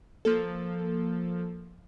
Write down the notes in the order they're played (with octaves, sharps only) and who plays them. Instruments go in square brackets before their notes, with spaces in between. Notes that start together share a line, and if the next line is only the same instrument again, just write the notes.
[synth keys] F3 A#3 A4